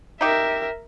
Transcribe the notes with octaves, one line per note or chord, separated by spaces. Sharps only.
D#4 G4 A#4 E5